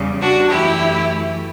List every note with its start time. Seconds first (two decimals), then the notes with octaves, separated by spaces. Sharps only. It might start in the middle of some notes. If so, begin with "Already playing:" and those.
Already playing: E2 C#3 E3 G3
0.20 D4 F#4
0.49 F#2 E3 A3 E4 G4